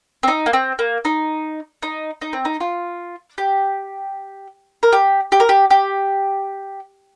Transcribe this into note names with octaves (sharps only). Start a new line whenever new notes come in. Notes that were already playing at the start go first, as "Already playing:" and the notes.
C4
D#4
A#3
C4
A#3
D#4
D#4
D#4
C4
D#4
F4
G4
A#4
G4
G4
A#4
G4
G4